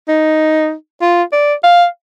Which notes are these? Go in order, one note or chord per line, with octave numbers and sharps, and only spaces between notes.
D#4
F4
D5
F5